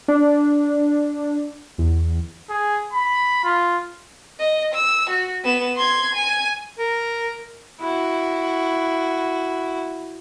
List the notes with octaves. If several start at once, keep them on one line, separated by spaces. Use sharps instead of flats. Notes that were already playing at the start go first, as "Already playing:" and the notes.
D4
E2
G#4
B5
F4
D#5
E6
F#4
B3 E7
C6 G#6
G#5
A#4
E4 F#4